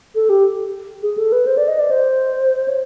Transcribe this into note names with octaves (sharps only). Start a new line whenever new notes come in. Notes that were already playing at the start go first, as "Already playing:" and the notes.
A4
G4
G#4
A4
B4
C5
D5
D#5
D5
C5
C#5